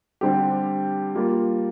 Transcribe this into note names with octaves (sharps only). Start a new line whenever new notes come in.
D3 G3 C4 G4
G3 A#3 F4